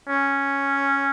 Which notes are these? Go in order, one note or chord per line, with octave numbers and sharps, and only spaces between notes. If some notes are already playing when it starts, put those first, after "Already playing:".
C#4